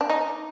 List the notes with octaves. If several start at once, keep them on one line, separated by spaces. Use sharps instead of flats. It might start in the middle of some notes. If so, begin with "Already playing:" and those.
D4
D#4